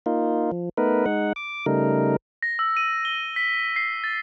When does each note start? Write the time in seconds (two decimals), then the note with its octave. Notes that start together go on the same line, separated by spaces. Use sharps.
0.06 A#3 D#4 F4
0.52 F3
0.77 A3 B3 D#4 A#4 B4
1.06 G#3 D#4 F#5
1.36 D6
1.66 C#3 G3 A3 D#4 A#4
2.43 A#6
2.59 E6
2.77 D#7
3.05 G7
3.36 B6
3.76 C7
4.04 A6